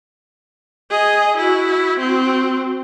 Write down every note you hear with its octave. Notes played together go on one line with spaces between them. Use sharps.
G#4 D#5
E4 F#4
C4 F#4